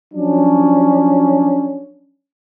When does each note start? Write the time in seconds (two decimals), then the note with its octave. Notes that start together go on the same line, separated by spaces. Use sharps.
0.14 F3 F#3 C#4 D4